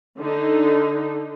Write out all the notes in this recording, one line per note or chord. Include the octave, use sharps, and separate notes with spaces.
D3 D#4